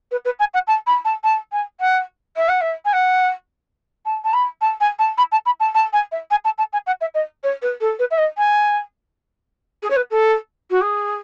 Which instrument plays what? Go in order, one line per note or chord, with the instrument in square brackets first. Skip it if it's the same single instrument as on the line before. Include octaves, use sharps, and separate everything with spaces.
[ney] B4
B4
G#5
F#5
A5
B5
A5
A5
G#5
F#5
E5
F#5
E5
G#5
F#5
A5
A5
B5
A5
G#5
A5
B5
A5
B5
A5
A5
G#5
E5
G#5
A5
A5
G#5
F#5
E5
D#5
C#5
B4
A4
B4
E5
D#5
G#5
G#4
C#5
B4
A4
F#4
G#4